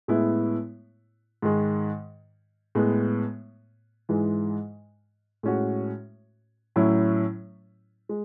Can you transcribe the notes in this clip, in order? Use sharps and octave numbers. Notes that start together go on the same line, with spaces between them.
A2 G#3 B3 E4
G#2 D#3 G#3
A2 G#3 B3
G#2 E3 G#3
A2 G#3 C#4 F#4
A2 F#3 C#4 E4
G#3